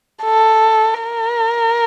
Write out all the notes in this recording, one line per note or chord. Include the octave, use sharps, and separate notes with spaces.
A4
A#4